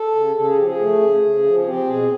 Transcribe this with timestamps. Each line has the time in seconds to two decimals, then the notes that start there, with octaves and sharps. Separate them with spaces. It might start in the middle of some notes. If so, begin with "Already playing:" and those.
Already playing: A4
0.15 C#3
0.36 C#3 A4
0.46 G#4
0.56 F3 G4
0.66 G#4
0.79 A3
1.01 C#3
1.23 C#3
1.44 F3
1.59 G#4
1.65 C4 G4
1.87 B2 G#4